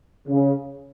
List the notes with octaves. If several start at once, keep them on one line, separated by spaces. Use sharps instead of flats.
C#3